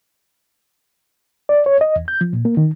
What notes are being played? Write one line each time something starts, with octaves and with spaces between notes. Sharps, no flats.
D5
C#5
D#5
E2
G6
F3
A#2
A#3
D#3